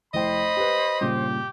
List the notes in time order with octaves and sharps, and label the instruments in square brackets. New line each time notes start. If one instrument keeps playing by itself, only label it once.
[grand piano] F1 E4 G5 [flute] C5 [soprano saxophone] D#5 [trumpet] B5
[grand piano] G4 B4
[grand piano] G2 A#2 C#3 [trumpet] G4